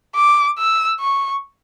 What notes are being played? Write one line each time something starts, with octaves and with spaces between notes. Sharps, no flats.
D6
E6
C#6